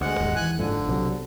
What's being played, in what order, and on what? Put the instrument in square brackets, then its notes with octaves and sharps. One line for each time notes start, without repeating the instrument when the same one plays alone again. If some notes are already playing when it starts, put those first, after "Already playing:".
[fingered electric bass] D2 [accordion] G#3 F#5
[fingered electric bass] D#1 D#2 G#2
[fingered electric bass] E3 [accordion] G#5 F#6
[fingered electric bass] F#1 G#2 F3 [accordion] D3
[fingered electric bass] B1 C3 F#3